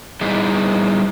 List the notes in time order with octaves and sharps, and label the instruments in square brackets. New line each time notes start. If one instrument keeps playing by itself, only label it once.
[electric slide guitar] G3 B3 D#4 E4 G#4